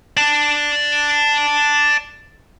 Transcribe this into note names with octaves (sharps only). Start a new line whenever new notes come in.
D5 A5